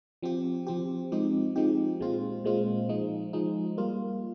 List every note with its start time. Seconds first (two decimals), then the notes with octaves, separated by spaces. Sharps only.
0.22 F3 C4 G4
0.67 F3 C4 G4
1.12 F3 G#3 C4 D#4 G4
1.56 F3 G#3 C4 D#4 G4
2.00 A#2 G#3 C4 F4
2.44 A#2 G#3 C4 F4
2.89 F3 G#3 D#4
3.33 F3 G#3 D#4
3.77 G3 A#3 F4